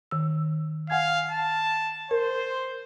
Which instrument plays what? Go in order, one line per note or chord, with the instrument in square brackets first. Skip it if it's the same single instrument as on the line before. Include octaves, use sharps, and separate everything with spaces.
[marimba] D#3 E6
[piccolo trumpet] F5 [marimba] F#5 G#5 G#6
[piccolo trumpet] A5
[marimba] A#4 [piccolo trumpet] C5